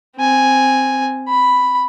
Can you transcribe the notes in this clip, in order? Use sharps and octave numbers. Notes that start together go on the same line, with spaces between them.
C4 G#5
B5